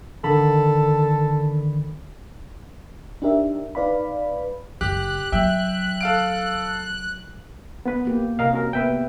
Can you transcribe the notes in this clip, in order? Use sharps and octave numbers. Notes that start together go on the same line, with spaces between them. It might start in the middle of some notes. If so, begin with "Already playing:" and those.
D3 D#3 A4 B5
D4 D#4 G4 A#4 E5
D#4 B4 D5 F5 B5
F#1 G4 F#6
F#3 E5 G5
A4 F5 D7
B3 B4
A#3 G4
C3 A#4 D#5 F5
C#4 F#4 A#4
B3 B4 E5 G5